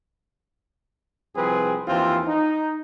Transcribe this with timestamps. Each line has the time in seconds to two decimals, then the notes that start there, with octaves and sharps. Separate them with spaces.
1.36 C2 F3 C4 G#4 B4
1.87 D#2 E3 F3 C4 F4
2.28 D#4